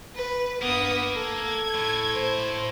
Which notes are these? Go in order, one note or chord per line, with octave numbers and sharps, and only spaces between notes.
B4
G2 A#3 B3 D#6
A4 G#6
A2
C5